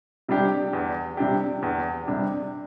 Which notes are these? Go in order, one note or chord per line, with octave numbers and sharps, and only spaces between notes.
C3 G3 D4 G4
E2
C3 G3 D4 G4
E2
C3 G3 D4 G4